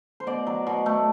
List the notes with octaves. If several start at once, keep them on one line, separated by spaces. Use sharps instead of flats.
C5
B2 D5
F#3
B2
A3